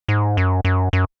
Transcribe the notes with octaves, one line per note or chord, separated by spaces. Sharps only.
G#2
F#2
F#2
F#2